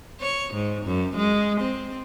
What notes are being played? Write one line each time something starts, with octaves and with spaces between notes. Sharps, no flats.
C#5
G#2
F#2
G#3
C4